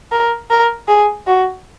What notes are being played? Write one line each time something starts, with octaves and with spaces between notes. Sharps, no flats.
A#4
A#4
G#4
F#4